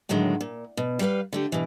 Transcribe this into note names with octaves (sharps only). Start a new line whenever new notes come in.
A2 D3 D#3 F#3 G#3
A#2
B2
G3 G4 A#4 B4 F5
D3 A3 G4
B2 E3